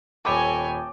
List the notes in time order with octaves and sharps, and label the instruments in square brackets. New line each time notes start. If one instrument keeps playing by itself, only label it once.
[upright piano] D#1 B5 D6 [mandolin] A4 D#5 G5 [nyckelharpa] C#5 G#5